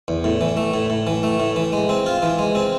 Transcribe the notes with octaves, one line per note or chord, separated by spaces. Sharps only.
E2
A2
E3
A3
A2
A2
E3
A3
A2
E3
G#3
C4
F4
E3
G#3
C4